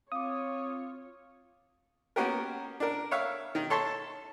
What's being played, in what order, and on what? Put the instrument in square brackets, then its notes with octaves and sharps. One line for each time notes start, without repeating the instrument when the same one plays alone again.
[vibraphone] C4 [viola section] F4 C#5 [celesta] F5 D6 [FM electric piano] D#6
[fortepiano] A#3 B3 C#4 F#4 G4 A#4
D4 A#4
C#5 E5 F5
D#3
A4 C#5 A5 C6